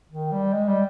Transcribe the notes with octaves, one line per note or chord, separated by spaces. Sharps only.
D#3
G3
G#3
G3